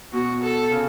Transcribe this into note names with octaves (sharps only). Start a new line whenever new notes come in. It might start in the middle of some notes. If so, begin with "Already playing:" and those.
B2 F#4
A4
C#3